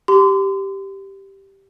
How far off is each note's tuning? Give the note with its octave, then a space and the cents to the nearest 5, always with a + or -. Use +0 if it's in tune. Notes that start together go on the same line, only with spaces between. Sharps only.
G4 -5 C6 -35